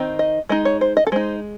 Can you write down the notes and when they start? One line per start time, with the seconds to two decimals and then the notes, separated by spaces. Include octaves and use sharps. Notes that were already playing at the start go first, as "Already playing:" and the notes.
Already playing: D#3 C4 D#4
0.19 D#5
0.49 G#3 D#4 D#5
0.65 C#5
0.81 C5
0.97 D#5
1.07 A4
1.12 G#3 D#4 C5